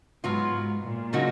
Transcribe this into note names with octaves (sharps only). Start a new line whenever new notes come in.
G#2 F#3 B3 F4
G#2
A#2
C#3 F#3 A#3 D#4 F#4